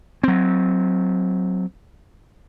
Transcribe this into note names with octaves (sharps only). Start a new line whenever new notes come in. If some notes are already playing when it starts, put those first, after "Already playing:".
F#3 C4